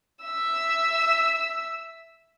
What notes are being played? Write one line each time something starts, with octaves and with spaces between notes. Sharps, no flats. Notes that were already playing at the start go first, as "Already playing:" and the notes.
E5 E6